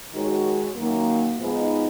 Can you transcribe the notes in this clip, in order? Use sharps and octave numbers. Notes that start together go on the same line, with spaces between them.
D#3 G#3 D#4 F#4 C#5
F#2 D#3 F#3 A#3
G#2 F3 G#3 B3 D#4